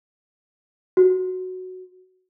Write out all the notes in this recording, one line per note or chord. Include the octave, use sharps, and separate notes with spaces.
F#4